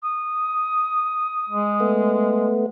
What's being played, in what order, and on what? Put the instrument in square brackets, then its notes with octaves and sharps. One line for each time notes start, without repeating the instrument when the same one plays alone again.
[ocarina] D#6
[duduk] G#3
[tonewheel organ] A3 B3